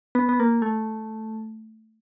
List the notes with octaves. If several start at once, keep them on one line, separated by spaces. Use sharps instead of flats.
B3
B3
A#3
A3